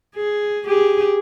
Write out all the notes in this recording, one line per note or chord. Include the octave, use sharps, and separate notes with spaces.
G#4
G4 G#4